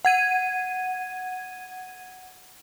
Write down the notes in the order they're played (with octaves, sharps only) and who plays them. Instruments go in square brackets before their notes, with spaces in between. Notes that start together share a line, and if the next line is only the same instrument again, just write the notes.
[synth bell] F#5 G#6 D#7